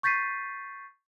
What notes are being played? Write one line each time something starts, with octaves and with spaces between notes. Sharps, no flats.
C#6 G6 A6 B6 C7 D#7